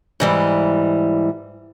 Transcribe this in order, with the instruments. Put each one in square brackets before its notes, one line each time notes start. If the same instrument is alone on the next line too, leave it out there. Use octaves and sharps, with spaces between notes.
[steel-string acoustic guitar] G#2 E3 G3